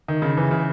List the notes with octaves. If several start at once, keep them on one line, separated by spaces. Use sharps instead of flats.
D#3
C#3
E3
C#3